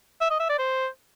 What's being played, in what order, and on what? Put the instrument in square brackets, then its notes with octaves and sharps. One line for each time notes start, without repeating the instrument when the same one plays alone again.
[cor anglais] E5
D#5
E5
D5
C5